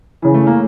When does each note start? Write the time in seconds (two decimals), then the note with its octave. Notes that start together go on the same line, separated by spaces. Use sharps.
0.22 C#3 E3
0.34 A3
0.47 A#3